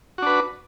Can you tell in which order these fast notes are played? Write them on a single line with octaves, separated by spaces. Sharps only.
F#4 D4 B4